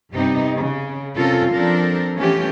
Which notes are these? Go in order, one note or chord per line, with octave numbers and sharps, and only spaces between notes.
G2 C3 B3 C4 D#4 G4
C#3
C3 C4 C#4 F4 A4 A#4
F3 C4 D4 A4 A#4
E3 A3 B3 C#4 F4 G4